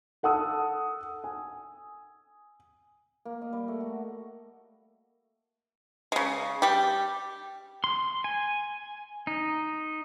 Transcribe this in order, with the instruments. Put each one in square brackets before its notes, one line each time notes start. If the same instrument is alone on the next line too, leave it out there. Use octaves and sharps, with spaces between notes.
[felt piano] A4 F#5 A5 D#6 E6
G#5
[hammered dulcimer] A#3
D#5
G3
A3
F#4
[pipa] C#3 G#3
G3 G4
[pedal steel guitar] C6
G#5
D#4